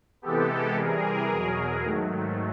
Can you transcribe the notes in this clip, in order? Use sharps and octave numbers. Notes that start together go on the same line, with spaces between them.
C3 E3 G#3 B3 G4 A4
C3 E3 G3 G#4 A#4
E2 B2 F#3
G#2 D#3 F#3 A3